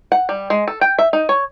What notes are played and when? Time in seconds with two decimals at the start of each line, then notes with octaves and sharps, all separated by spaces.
0.12 F#5
0.29 G3
0.50 G#3
0.68 A4
0.81 G5
0.99 E5
1.13 D#4
1.29 C#5